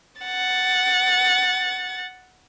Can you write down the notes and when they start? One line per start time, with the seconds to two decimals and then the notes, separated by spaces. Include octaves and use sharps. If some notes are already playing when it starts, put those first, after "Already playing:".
0.21 F#5 A6